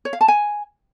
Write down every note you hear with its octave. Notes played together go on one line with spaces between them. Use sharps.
C#5
F5
A5
G#5